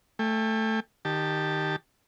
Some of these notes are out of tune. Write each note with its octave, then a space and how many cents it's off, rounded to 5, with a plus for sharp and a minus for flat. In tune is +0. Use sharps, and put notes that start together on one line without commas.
A3 +0 G5 +40
D#3 -20 G4 +0 A5 +0